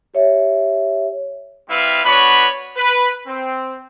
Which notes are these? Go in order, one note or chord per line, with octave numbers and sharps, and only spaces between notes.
G4 C#5 E5
G3 C4 E4 B4 E5 F5
B3 D4 F#4 B4 C#5 B5
B4
C4